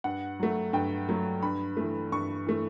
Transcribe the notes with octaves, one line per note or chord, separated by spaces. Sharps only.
G2 F#5
F#3 A3
G2 G5
F#3 A3
G2 B5
E3 A3
G2 C#6
E3 A3